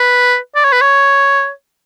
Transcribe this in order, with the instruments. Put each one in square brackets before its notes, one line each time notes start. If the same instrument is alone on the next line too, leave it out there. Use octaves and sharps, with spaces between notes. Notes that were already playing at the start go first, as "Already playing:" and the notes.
Already playing: [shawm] B4
D5
C#5
B4
C#5